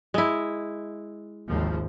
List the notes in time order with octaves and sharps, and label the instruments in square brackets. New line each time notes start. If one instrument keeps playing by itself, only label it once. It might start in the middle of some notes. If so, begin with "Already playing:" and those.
[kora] G#3 E4
[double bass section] G#1 D#2 F3